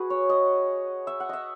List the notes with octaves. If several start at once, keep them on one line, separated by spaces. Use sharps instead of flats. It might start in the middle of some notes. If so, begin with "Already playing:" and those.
Already playing: F#4 G#4 B4
C#5
D#5
E5
F#5
D#5 E5